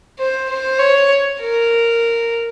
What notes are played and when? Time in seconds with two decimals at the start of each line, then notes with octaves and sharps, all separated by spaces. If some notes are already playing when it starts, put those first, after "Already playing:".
0.19 C5
0.49 C5
0.79 C#5
1.40 A#4